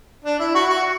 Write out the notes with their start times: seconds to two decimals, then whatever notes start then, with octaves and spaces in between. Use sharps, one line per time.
0.24 D4
0.39 E4
0.55 F#4
0.70 F#4